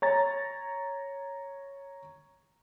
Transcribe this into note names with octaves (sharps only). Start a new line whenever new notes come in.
C#5 A#5 A6